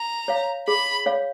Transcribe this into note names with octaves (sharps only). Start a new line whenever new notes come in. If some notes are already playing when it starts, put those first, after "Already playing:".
Already playing: A#5
C#5 F5
G#4 B5
C#5 F5